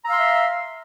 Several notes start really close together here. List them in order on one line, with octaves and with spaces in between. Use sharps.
A#5 E6 F5 C6 E5